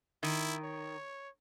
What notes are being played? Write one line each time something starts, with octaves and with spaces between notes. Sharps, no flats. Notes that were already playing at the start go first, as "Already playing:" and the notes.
D#3 E4
C#5